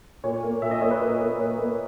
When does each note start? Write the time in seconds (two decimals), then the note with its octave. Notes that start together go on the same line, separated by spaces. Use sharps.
0.24 A#2 C#5
0.43 A#3
0.62 A#2 E5
0.71 D#5
0.81 A#3 C#5
0.91 B4
1.00 A#2 A#4
1.20 A#3
1.39 A#2 C#5
1.58 A#3